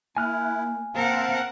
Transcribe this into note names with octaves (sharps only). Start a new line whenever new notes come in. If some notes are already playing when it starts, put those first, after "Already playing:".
A#3 E4 G#5 F6 F#6
A#3 C4 A#4 F5 F#5 A5